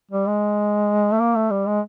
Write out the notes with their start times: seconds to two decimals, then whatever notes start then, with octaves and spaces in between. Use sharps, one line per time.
0.11 G3
0.27 G#3
1.13 A3
1.20 A#3
1.35 A3
1.50 G3
1.66 G#3